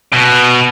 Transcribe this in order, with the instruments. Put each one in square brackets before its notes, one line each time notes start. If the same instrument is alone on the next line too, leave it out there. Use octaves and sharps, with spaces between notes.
[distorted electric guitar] B2